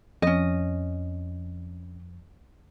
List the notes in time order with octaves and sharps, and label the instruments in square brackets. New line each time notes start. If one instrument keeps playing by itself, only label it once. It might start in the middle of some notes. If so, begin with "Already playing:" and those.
[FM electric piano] F2 [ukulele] C#4 D#5